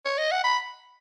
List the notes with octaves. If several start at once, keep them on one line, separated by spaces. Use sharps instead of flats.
C#5
D#5
F#5
B5